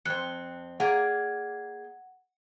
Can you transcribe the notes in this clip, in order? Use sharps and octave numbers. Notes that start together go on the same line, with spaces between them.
F2 C4 F#6 C#7
A#3 G#4 D5 F#5